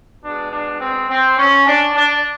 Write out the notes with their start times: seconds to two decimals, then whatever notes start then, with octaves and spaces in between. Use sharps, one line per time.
0.23 B2 G#3 D4
0.52 D4
0.80 C4
1.09 C4
1.38 C#4
1.67 D4
1.95 D4